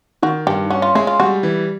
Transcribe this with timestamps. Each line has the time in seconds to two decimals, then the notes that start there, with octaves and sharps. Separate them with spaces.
0.23 D#3 F#4
0.47 G2 G4
0.70 C#4 F#4
0.82 F4
0.95 G#3 E4
1.07 F4
1.20 G3 F#4
1.43 E3